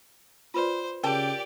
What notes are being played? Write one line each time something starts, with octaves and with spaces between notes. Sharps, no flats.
F4 B4 C5 D5
C#3 G4 A#4 D5 G5 A5